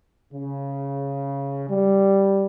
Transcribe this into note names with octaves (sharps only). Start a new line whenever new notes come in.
C#3
G3